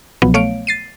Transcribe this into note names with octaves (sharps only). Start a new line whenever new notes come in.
C2 B2 F3 F#3 B3
A3 C#5 F5 D7
A6 C7 D#7